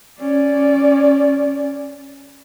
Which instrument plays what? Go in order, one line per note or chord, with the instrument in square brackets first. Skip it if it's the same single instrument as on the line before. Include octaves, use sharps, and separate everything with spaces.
[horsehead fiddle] C#4 D5